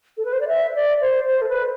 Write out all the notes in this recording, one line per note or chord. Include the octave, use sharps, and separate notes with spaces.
A4
B4
C5
D5
E5
D5
C5
C5
A4
B4